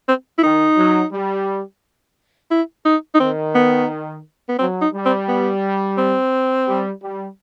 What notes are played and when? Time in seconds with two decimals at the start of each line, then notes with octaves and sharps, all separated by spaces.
0.09 C4
0.38 E4
0.42 D#3 D#4
0.77 F#3
1.12 G3
2.51 E4
2.86 D#4
3.15 D#4
3.20 D#3 C4
3.55 B3
4.49 B3
4.59 F#3 C4
4.82 D#4
4.93 G3
5.05 C4
5.28 B3
5.98 C4
6.67 G3
7.02 G3